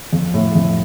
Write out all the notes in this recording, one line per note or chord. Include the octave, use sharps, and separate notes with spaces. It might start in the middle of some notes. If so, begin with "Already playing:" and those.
F2
A2
F2